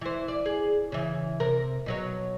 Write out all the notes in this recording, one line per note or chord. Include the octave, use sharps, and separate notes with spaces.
E3 C5
D5
G#4
C#3 E3
C3 A#4
B2 F#3 C#5